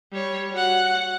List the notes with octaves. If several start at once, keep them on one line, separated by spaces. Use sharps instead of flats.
G3 C#5
F#4 F#5